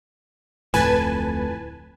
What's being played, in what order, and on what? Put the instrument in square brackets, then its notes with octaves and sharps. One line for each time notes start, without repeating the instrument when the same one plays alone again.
[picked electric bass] D1 F2 A2 [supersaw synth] B4 G#5 A5